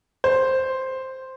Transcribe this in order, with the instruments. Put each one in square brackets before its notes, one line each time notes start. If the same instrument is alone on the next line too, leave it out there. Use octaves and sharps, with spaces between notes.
[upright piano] C5